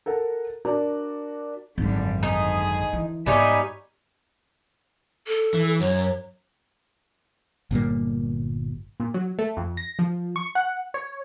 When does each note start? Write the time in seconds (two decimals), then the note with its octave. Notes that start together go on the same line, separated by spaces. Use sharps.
0.06 A4 A#4 F#5
0.65 D4 F#4 A#4 D5
1.78 G#1 F#2 D3 G3
2.23 D2 D#4 G#4
2.93 E3
3.26 G#2 G3 B3 D#4 C#5 E5 G#5
5.27 A4
5.54 E3
5.80 F#2 C#5
7.71 G1 A#2 G3 A#3
9.00 A#2
9.14 F#3
9.39 A3
9.57 F2
9.77 A#6
9.99 F3
10.36 C#6
10.55 F#5
10.94 C#5